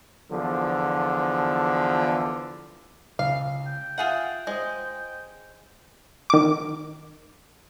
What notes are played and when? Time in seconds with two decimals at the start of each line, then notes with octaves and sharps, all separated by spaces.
0.31 E2 D3 F3
3.19 C#2 F5
3.67 G5
3.98 F4 G#4 E5 F#5
4.47 G#3 C5 D#6
6.30 D#3 D6